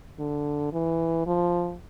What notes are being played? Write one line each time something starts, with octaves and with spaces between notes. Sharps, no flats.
D3
E3
F3